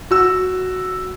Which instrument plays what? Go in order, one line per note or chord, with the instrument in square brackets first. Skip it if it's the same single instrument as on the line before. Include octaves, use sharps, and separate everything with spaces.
[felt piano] F#4 E6